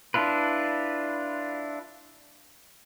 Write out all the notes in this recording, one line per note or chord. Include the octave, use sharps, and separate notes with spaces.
D4 E4 F4 B4